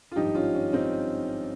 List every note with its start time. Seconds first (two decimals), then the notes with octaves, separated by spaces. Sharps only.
0.11 F4
0.16 G#1 G2 F3 D#4 G4
0.35 C#4 F4
0.54 C#4
0.73 C4 D#4